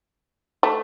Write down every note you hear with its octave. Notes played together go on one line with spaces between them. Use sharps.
A3